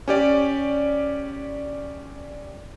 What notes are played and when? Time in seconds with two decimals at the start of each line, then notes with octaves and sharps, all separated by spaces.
0.08 C#4 G4 D5